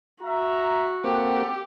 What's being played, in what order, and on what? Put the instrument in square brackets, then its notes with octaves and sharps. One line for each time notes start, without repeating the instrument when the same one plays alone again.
[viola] F#4 [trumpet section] E5 A#5
[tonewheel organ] A#3 C4 [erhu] G4 [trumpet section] A4 F#5